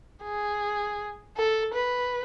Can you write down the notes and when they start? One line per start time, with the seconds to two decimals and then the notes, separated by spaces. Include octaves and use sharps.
0.23 G#4
1.37 A4
1.74 B4